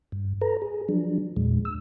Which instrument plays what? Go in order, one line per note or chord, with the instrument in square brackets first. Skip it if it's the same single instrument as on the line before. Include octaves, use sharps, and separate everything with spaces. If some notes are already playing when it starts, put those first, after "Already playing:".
[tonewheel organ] G2
A4 B4 A#5
G#4
F3 F#3 D4
E2 A#2 G#3
E6